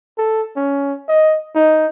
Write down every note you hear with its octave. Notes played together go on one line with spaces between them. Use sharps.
A4
C#4
D#5
D#4